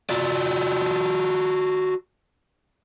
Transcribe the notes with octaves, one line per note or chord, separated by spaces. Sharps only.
F4 F#4 D5